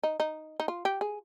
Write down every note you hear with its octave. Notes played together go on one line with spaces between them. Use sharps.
D#4
D#4
D#4
F4
G4
G#4